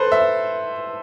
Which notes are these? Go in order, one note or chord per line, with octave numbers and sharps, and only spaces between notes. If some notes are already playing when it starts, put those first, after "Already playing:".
Already playing: A4 B4 C5
E5